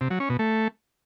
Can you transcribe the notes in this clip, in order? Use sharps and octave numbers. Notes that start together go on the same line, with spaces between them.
C3
F#3
C#4
B2
A3